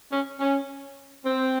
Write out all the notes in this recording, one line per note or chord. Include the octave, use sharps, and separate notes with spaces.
C#4
C#4
C4